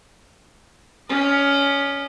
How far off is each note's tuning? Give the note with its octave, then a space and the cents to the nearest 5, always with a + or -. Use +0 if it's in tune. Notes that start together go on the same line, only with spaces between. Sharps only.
C#4 +15 D#5 -35